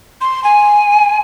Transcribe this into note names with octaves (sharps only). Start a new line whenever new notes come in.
C6
G#5